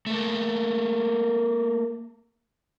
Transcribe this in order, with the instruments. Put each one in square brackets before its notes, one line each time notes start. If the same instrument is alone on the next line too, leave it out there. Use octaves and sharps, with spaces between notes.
[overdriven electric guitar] A3 A#3